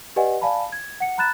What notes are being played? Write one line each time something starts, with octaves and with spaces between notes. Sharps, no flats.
G4 B4 D5 D#5 F#5 G#5
D5 F5 G#5 A5 B5
G#6
F#5 C#7
A#5 B5 F#6 A6 E7